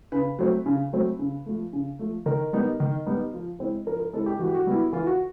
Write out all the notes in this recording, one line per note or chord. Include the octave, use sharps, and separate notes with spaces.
C#3 B4
F#3 A3 C4
C#3
F#3 A3 C4
C#3
F3 A3
C#3
F3 A3
D#3 A#4
G3 B3 D#4
D#3
G3 B3 D#4
F3
G#3 C4 E4
F3 A#4
A#4
G#3 C4 E4 A4
G4
E3 F#4
G4
F#4
G3 B3 E4
E3 F4
F#4